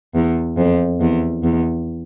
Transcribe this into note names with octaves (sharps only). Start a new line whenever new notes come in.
E2
F2
E2
E2